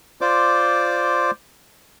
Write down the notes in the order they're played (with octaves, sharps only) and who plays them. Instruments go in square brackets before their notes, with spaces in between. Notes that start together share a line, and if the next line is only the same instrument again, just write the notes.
[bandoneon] F4 C5 D5 D6